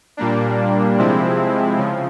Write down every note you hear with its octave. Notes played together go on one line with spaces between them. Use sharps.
A#2 G3 A#3 D4
C3 F3 G#3 C4 E4
C#3 F3